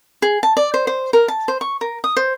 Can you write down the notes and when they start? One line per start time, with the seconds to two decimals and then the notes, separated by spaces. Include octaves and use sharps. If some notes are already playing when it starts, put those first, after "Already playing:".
0.22 G#4
0.43 A5
0.57 D5
0.74 C5
0.87 C5
1.13 A#4
1.28 A5
1.48 C5
1.61 C#6
1.81 A#4
2.04 D#6
2.17 C5